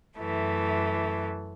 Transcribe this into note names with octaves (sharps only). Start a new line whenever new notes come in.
F#2 E3 A3